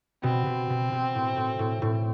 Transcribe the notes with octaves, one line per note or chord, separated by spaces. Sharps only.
B2 C4
B2
B2
B2
A2
A2
A2
A2